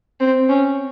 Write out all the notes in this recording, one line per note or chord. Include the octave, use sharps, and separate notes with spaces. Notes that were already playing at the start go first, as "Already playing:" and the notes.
C4
C#4